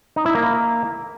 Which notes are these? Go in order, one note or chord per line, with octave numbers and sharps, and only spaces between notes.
D#4
E4
A#3